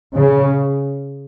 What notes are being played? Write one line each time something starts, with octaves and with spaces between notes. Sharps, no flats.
C#3